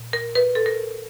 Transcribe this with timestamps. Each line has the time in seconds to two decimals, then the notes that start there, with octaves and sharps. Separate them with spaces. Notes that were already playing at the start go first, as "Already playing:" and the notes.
Already playing: A#2
0.13 A#4
0.35 B4
0.55 A4
0.66 A#4